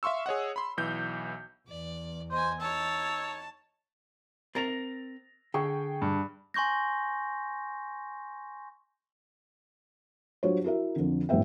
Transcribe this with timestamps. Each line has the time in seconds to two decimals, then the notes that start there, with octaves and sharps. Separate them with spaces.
0.03 E5 F5 C6 C#6 E6
0.26 G#4 C#5 D#5 F#5
0.56 B5 C6
0.77 B1 E3 G6
1.68 E2 D5
2.31 C5 D#5 G#5
2.61 D#4 C#5 A5 E6
4.55 C4 A#4 A6 A#6 F7
5.54 D3 G#4 G5 C#6
6.02 G2
6.54 G#5 C6 C#6 G6 A#6
10.43 F#3 G3 D4 F4 C5 C#5
10.64 E4 F#4 A#4 E5
10.96 F2 D3
11.29 G1 F2 A2 B3 E5 G5